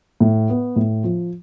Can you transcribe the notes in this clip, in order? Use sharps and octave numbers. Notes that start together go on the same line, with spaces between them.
A2
B3
A2
F3